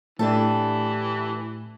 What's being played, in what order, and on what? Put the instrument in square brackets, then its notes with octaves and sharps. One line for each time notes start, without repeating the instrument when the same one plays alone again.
[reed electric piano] A2 A3 [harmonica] E3 [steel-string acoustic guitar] D4 G4 A4